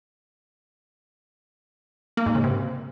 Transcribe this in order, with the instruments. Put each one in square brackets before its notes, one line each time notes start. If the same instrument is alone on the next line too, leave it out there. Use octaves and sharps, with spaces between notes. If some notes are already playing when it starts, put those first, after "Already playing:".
[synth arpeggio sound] A#3
G#2
C#3
C3